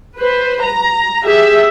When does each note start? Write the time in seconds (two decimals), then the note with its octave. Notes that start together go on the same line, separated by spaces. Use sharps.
0.17 B4 C5
0.63 A#5
1.22 G4 G#4 E5